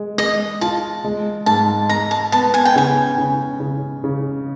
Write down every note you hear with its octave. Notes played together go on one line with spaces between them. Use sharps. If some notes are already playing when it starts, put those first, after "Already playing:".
Already playing: G#3
G#3 D#5
F4 A5
G#3
G#2 A5
G#3 A#5
A5
B3 A5
G#5
G5
C#3 G#5
C#3
C#3
C#3